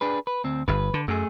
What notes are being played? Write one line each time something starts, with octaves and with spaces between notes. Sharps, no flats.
D4 G#4 B4
B4
D2 C4
G1 G2 B4
D3
F#2 A3 G#4